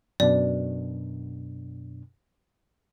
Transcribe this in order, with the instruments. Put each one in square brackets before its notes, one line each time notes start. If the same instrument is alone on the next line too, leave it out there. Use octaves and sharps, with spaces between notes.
[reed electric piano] F#2 B2 D4 [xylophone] D5